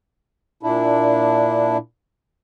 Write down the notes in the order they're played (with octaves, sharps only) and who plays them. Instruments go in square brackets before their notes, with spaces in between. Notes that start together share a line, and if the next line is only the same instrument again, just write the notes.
[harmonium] A#2 D4 E4